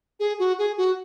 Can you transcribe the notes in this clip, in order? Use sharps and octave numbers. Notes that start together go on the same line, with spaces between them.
G#4
F#4
G#4
F#4